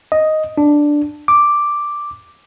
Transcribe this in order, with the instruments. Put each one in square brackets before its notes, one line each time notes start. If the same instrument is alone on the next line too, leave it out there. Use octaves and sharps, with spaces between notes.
[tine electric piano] D#5
D4
D6